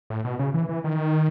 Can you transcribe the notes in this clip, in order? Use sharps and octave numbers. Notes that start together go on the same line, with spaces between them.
A2
B2
C#3
E3
E3
D#3